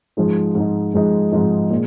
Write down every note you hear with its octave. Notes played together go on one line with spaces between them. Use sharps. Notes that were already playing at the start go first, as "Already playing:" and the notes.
G#2 F3 G#3 D#4
G#2 F3 G#3 D#4
G#2 F3 G#3 D#4
G#2 F3 G#3 D#4
A#2 G#3